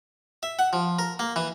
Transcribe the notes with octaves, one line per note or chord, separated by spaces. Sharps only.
E5
F#5
F3
A#4
A#3
E3